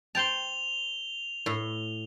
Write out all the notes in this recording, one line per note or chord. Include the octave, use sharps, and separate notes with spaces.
C5 G5 A5 F7 G7
A2